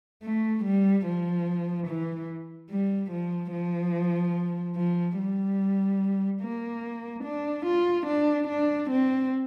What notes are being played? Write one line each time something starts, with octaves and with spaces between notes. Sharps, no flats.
A3
G3
F3
E3
G3
F3
F3
F3
G3
A#3
D4
F4
D4
D4
C4